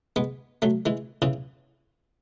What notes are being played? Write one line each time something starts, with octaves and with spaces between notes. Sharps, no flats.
G#3 B3
F#3 A3
E3 G#3
C#3 E3